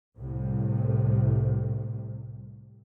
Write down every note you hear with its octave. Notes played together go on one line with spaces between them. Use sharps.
C2 A2 C3